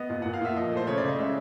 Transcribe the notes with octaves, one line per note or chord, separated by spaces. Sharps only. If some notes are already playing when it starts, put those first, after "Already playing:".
Already playing: B3 D#5
A#2
A#2 F#5
F5
A#2 E5
F3 D#5
A3
C5
C#3 C#5
C#3 D5
D#5
G#3 E5